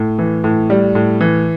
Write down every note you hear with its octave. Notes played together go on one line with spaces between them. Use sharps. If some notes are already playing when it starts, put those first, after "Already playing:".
Already playing: A2
E3
A2
G3
A2
E3